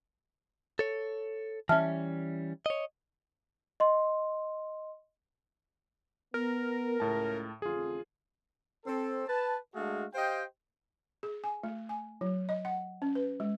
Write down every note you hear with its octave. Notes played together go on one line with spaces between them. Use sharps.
A4 C#5
E3 G3 C#4 E5 A5 F6
C#5 D#5
D#5 C6
B3 A#4
C#2 A2 A5
A1 F2 D3 F4 G#4
C4 A4
B4 A5
G#3 A3 D4 F#4 G#4 F5
G4 C5 D#5 F5 G5
G#4
G#5
A3
G#5
F#3
D#5
F#5
C#4
B4
G#3